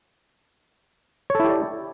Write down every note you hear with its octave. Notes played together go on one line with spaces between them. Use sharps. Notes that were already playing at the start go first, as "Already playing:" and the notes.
E4 G4 A4 C#5 D5